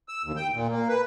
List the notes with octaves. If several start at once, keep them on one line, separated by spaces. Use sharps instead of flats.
E6
D#2
G5
A#2
A#3
B4